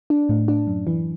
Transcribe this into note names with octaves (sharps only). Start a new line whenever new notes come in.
D4
A2
D4
F#2
E3